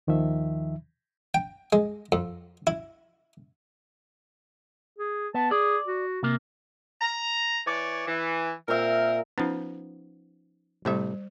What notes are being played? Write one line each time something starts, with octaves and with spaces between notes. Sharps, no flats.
D#2 D#3 F3 E5
G5
G#3
F2
E4
G#4
B3 A5
G#4 D5
F#4
C3 A#3
A#5
E3 C#5 D5
E3
A#2 C4 A#4 E5
F3 B3 C#4 D#4
A2 C3 G3 C5 E5